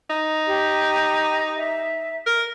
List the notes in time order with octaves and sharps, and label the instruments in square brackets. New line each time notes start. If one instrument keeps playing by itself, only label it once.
[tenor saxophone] D#4
[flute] G4
E5
[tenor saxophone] A#4